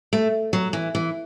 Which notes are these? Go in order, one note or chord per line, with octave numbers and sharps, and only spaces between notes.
A3
F#3
E3
E3